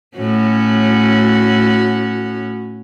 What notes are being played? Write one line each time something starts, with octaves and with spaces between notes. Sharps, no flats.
A2 C#4 F#4